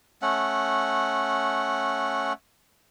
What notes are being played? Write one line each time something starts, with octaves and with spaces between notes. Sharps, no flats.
A3 C#4 F#5